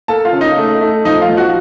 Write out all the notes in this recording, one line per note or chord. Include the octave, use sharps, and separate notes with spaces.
A#3 A4 A5
F4 F5
C#3
D#4 D#5
A3
A3
F3 D#4 D#5
F4 F5
F3
F#4 F#5